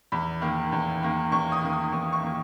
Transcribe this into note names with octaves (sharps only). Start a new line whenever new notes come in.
E2 B5
D#3 A#3
E2
D#3 A#3
E2 C#6
D#6
D#3 A#3
D#6
E2 C#6
C#6
D#3 A#3